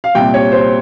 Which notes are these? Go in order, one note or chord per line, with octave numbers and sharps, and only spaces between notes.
F5
C2 A#2 G3 C4 G5
C#5
C5